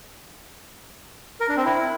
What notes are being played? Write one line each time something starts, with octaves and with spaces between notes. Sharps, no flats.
A#4
D4
C4
E4